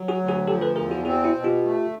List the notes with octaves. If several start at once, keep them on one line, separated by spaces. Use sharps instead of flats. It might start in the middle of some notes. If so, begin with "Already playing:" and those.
Already playing: F#3
F#4 G#4
D2
F#4 G#4
F3 G4 A4
A4 B4
E2 G#4 A#4
F#4 G#4
C4 F#4 G#4
E4 F#4
B2
F4 G4
A3